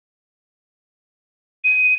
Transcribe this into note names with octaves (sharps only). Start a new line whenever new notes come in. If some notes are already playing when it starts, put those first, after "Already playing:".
D#7